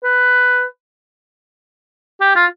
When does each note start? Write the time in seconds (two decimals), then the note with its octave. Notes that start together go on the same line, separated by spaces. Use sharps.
0.04 B4
2.21 G4
2.35 F4